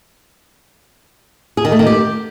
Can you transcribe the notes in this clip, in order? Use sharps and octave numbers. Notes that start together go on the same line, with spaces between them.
G#4
D#3
A3
D#3
G4